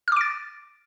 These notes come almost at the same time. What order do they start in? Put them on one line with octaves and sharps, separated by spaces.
F6 D6 D7 A6